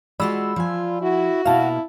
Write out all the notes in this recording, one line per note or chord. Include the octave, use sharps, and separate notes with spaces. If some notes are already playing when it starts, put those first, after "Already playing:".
G#3 F4 F#4 D5 B5 E6
F3 F4 G#5
E4 F#4
B2 A#3 E4 F5 A5